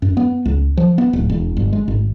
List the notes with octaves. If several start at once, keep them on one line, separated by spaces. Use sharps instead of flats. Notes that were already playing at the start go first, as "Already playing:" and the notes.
F#2
B3
C#2
F3
B3
D1
E1
G1
G#3
G#1